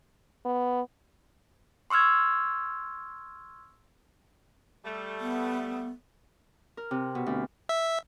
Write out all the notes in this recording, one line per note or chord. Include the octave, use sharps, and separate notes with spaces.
B3
C6 C#6 E6 F6 G#6
G3 A3
B3
A#4
C3
B2
D2
E5